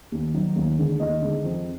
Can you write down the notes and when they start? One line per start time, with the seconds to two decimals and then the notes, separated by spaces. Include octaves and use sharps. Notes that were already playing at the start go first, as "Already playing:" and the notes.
0.12 D#2
0.34 D#3 F#3
0.56 D#2
0.79 D3 G#3
1.00 D#2 D#4 D#5
1.22 D3 G#3
1.44 F2